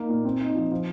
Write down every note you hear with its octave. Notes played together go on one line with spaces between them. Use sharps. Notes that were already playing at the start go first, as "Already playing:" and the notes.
Already playing: A#3 D#4
A#2
C4
D#4
F3
F3